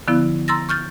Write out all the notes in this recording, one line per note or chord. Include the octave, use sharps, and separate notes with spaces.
D3 F3 B3 E4
A#5 C6 E6 A6 A#6
C#6 F6 G6 A6